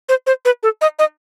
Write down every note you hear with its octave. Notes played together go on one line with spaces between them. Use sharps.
C5
C5
B4
A4
D#5
D#5